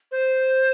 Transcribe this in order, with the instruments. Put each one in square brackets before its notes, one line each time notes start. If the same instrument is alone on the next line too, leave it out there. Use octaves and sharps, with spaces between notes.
[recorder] C5